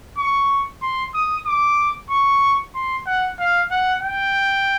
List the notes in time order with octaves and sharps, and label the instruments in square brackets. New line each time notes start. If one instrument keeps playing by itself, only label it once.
[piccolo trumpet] C#6
C6
D#6
D6
C#6
C6
F#5
F5
F#5
G5